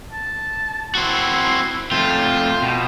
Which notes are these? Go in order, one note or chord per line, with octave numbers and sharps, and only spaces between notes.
A5
C4 E4 F#4
F2 A3 F4 G5
B2